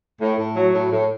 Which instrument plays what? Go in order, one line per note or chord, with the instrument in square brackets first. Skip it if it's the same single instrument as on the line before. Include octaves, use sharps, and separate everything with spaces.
[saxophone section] A2
A2
F#3
A2
A2